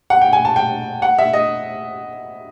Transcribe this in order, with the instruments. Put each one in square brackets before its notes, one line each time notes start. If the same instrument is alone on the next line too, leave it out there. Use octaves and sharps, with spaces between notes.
[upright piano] F#5
G5
G#5
A5
G5
F#5
E5
D#5